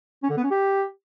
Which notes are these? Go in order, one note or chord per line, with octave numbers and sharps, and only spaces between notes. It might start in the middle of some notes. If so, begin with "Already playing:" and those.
C#4
D3
B3
C#4
G4